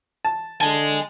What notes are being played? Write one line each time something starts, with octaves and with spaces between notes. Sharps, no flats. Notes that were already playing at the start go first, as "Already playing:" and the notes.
A5
D3 D#5 G#5 A5